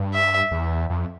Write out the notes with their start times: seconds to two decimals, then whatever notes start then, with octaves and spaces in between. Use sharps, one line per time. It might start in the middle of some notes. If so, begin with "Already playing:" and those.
Already playing: G2
0.14 E5
0.51 E2
0.90 F2